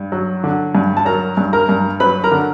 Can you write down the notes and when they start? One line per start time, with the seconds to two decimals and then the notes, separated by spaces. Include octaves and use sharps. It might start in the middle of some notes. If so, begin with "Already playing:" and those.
Already playing: G2
0.12 F#3
0.44 D3
0.75 G2
0.97 A5
1.05 F#3 A#4 A#5
1.37 G2
1.53 A#4 A#5
1.69 G2
2.00 F#3 B4 B5
2.24 A#4 A#5
2.31 D3